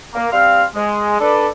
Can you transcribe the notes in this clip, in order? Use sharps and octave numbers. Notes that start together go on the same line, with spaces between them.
A#3
G3 C4 F5
G#3
D4 A4 B4 D5